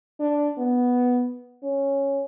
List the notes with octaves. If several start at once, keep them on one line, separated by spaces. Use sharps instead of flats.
D4
B3
C#4